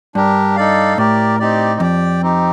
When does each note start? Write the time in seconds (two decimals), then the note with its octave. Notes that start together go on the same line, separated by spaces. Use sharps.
0.15 G2 D4 G4 A#4
0.56 D#4 A4 D5 F5
0.97 A2 G4 A#4 D5
1.39 C4 D#4 G4 D5
1.80 F2 G4 D5 G5
2.22 C4 D#4 G4